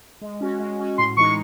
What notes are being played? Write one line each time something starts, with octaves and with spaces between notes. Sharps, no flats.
G#3
C#4 F#4
G#3
C#4 F#4
A2 C6
E3 G#3 D#4 C#6